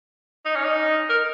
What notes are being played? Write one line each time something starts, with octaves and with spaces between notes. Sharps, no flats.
D#4
C#4
D#4
A#4